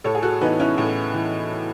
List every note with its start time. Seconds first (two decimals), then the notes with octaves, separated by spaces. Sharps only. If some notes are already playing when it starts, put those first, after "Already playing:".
0.04 A2 A4 C#5
0.15 G#4
0.23 F#4 A4
0.41 E3 B3 D#4
0.60 C#4 E4
0.78 A2
1.14 E3